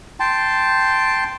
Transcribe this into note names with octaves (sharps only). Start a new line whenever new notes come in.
G5 A5 C6